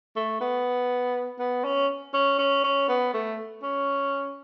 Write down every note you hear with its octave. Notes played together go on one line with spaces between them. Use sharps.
A3
B3
B3
C#4
C#4
C#4
C#4
B3
A3
C#4